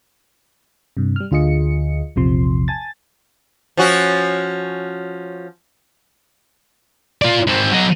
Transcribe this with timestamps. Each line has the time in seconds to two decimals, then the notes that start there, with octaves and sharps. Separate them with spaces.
0.97 G2 C3
1.16 G3 F6
1.31 D2 D3 F4 G#4 D#5 C#7
2.16 A#1 E2 C3 F3 C6
2.68 G#5 A5 A6
3.77 F3 C#4 F#4
7.22 F4 D5
7.47 G#2 C4
7.72 F#3 D#5